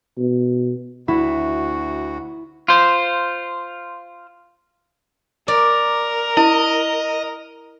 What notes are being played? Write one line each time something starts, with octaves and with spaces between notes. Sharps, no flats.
B2
D2 E4 F#4
F4 C5
A#4 D5
E4 D#5